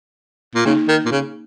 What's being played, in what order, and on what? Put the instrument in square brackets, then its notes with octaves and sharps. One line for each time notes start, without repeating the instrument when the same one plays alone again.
[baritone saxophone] A#2
[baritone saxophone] C#3 [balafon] A#3 D#4
[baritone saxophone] D#3
A#2
C#3